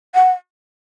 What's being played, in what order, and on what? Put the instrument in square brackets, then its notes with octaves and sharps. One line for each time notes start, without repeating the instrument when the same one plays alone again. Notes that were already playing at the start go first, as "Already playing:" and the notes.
[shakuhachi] F#5